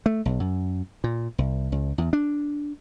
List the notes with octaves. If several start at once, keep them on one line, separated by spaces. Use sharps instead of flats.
A3
B1
F#2
A#2
C2
C#2
E2
D4